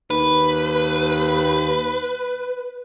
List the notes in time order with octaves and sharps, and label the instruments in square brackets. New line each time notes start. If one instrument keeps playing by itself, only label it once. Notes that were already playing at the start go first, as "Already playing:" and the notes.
[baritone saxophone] D#2 [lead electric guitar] B4